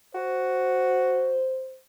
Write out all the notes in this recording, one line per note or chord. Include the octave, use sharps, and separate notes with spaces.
F#4 C5